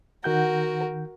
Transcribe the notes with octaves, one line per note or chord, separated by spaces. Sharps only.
D#3 F#4 A#4 F#5 G6